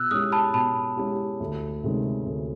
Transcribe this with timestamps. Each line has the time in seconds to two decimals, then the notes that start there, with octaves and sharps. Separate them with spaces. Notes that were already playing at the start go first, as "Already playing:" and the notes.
Already playing: B2 E6 F#6
0.11 G#3 C#4 E4 G4 D#6 F6
0.32 A5 B5
0.54 B2 A5 B5
0.97 G#3 C#4 E4 G4
1.40 D2
1.83 C3 D#3 G#3 C#4
2.26 D2